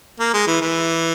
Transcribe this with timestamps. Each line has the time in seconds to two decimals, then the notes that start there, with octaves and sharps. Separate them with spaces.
0.19 A#3
0.34 G#3
0.47 E3
0.61 E3